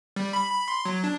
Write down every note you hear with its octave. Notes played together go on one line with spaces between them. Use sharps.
G3
B5
B5
C6
F#3
D4